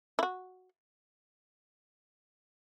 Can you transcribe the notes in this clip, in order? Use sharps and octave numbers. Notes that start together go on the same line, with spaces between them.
E4
F#4